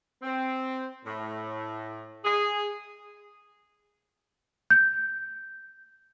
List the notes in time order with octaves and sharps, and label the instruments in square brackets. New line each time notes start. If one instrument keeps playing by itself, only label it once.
[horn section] C4
A2
G#4
[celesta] G6